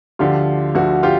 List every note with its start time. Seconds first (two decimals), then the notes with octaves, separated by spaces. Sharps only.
0.19 D2 D3 F3 F4 G4
0.75 D2 D3 F3 F#4
1.03 F4 G4